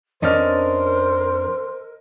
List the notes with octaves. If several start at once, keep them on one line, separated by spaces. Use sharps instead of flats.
F2 C#4 D4 A#4 C5 D#5 F6